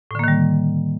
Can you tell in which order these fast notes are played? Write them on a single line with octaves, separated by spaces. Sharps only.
A2 D3 A#3 D#3 G3